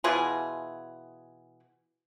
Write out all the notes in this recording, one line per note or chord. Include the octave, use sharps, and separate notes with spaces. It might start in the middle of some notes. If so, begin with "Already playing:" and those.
B2 E3 F4 G#4